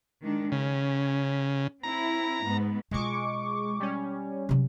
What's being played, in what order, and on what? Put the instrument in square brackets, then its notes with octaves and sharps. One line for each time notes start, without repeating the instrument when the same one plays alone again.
[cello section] D#3 G#3 D4
[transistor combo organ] C#3 [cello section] C#4
[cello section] C4 E4 [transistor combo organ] A#5
[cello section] G#2 B3
[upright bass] B2 F4 [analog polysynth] G#3 C#6 D6
[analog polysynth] G3 C#4
[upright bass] C3 F#3